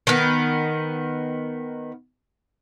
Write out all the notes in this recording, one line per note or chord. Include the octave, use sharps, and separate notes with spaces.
D#3 B3